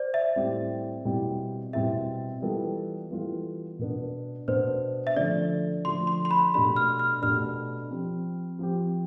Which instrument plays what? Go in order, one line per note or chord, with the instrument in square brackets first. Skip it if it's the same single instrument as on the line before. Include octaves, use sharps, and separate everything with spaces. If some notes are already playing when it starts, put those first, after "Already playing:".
Already playing: [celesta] C5 D5
E5
[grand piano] A2 G3 C4 E4 G4
B2 G3 C4 E4 G4
[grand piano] B2 G3 C4 E4 G4 [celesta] E5
[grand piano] E3 G3 B3 F4 A4
E3 G3 B3 F4 A4
B2 B3 D4
[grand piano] B2 B3 D4 [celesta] C5
[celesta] E5
[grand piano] D3 F3 A3 [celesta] D5
[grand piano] D3 F3 A3 [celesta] C6
[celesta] C6
C6
B5
[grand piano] B2 A3 D4 G4 [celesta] B5
[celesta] F6
F6
[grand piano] B2 A3 D4 G4 [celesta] F6
[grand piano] F3 C4 G4
F3 C4 G4